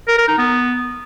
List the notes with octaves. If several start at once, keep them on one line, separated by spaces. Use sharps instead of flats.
A#4
A#4
D#4
B3